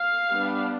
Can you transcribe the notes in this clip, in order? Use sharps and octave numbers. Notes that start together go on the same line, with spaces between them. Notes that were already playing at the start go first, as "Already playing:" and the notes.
Already playing: F5
G3 B3 D4